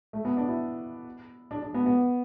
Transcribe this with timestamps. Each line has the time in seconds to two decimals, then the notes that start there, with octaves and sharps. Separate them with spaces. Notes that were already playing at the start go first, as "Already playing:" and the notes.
0.13 A3
0.25 B3
0.37 D4
0.48 E4
1.51 D4
1.62 D4
1.74 B3
1.86 B3